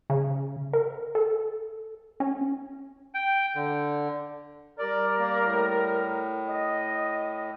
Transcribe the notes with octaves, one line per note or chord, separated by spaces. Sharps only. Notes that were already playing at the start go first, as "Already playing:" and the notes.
C#3
A#4
A4
C#4
G5
D3
G3 G4 A#4 D5
A#3 D5
A2
D#5